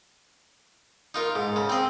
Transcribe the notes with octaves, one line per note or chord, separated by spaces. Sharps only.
D#4 F4 A#4
G#2
C#3
C4 D#5